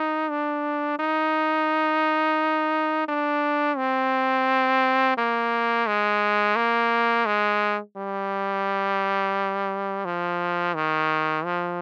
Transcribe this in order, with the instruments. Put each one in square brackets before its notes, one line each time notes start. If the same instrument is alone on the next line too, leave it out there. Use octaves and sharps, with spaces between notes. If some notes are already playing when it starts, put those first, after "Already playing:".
Already playing: [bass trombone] D#4
D4
D#4
D4
C4
A#3
G#3
A#3
G#3
G3
F3
D#3
F3